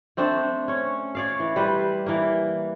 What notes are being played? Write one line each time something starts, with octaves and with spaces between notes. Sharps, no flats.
A3 C4 D4
C#4 C#5
C#5 D5 F5
E3
G3 B4 C5
E3 A#3